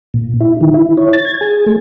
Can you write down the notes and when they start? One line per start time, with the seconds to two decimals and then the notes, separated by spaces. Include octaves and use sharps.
0.14 A#2
0.41 E4
0.61 D#3
0.74 E4
0.97 C#5
1.13 A6
1.25 G#6
1.41 G#4
1.66 A3